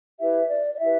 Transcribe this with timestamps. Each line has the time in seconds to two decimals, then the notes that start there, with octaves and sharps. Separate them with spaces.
0.19 E4 G4 B4 E5
0.49 D5
0.75 D5
0.80 E4 G4 B4 E5